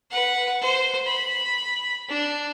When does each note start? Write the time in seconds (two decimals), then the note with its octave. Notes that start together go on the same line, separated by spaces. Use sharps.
0.11 B4 F#5
0.61 C5
1.06 B5
2.09 D4